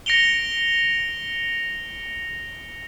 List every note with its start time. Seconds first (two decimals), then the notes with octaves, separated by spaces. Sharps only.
0.06 A#6 C#7 D7 F7 G7